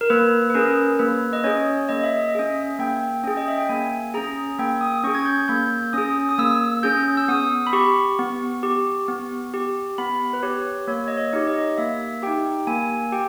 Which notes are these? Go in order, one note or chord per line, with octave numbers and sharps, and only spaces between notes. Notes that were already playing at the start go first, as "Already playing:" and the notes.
A#4
A#3 B4
B4
C#4 G#4 A#4
A#3 B4
D#5
C#4 G#4 C#5
A#3 D#5
E5
D#5
C#4 G#4 E5
A#3 G5
C#4 G#4
D#5
E5
G5
A#3 G#5
C#4 G#4 A#5
A#3 G5
D#6
C#4 G#4 C#6
G#6
G6
A#3 G6
C#4 G#4 D#6
D#6
A#3 E6
C#4 G#4 G6
E6
B3 D#6
B5
G4 C#6
B3
G4
B3
G4
B3 B5
B4
G4 C#5
A#3 C#5
D#5
C#5
D#4 G4
D#5
A#3 E5
D#4 G4 G5
A#3 G#5
G4 G5